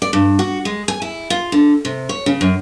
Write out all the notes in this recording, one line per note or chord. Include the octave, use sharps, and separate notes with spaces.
D5
G2
F#4
G#3
G#5
E4
F4
D3
C3
C#5
C#3
F#2